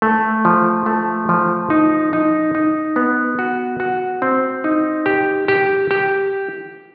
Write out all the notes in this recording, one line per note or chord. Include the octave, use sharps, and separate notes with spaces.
A3
F3
A3
F3
D#4
D#4
D#4
B3
F#4
F#4
C4
D#4
G4
G4
G4